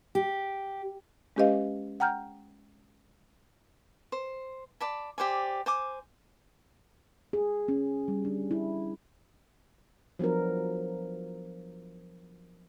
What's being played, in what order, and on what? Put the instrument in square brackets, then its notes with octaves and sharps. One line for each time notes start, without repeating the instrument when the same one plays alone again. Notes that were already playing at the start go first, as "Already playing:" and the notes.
[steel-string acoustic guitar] G4
[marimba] G#3 C#4 G4 B4 D#5 F5
F#5 G5 A#5 F6 G6
[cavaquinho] C5
D5 A5 B5
G4 C5 D5 G#5
C5 G#5 D6
[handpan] G#4
C#4
G3
D4
E4
F3 F#3 B3 D4 A#4